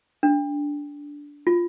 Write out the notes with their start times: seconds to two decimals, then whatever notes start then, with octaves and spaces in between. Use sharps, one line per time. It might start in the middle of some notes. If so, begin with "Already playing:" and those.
0.23 D4
1.47 F4